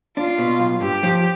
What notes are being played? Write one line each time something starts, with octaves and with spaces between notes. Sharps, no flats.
D4 F4
B2
B1
G2 G4
F3